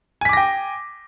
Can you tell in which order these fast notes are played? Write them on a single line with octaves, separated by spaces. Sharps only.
G#5 B6 D6 A#6 G5